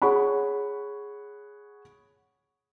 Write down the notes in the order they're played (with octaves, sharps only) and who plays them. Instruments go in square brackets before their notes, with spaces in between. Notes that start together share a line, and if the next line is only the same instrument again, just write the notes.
[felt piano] G#4 C#5 F#5 B5 C#6